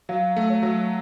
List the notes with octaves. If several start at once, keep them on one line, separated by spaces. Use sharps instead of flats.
F#3 F5
A3
C#5
F#3